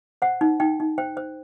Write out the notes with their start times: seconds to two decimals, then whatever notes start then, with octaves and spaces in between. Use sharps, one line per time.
0.22 C5 F#5
0.41 D#4
0.60 D#4 G5
0.80 D#4
0.98 C5 G5
1.17 C5